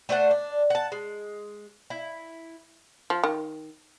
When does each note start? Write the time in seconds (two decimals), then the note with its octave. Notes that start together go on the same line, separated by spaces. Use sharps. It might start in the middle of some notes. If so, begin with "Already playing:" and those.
0.09 A3 D4 C5 F#5
0.31 D4
0.70 F#5 A5
0.92 G#3
1.90 E4
3.10 F3
3.24 D#3